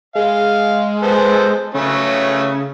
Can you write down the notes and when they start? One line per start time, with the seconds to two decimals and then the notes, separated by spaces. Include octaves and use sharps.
0.15 G#3 F5
1.03 B3 A4 C5
1.74 C#3 F#3 A3 C#4